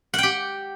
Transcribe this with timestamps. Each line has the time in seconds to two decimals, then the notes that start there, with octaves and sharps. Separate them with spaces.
0.14 F#5
0.18 G5
0.23 G4